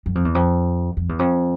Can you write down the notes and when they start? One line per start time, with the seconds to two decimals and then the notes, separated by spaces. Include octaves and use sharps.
0.06 F#2
0.15 F2
0.25 E2
0.35 F2
0.97 F2
1.09 E2
1.19 F2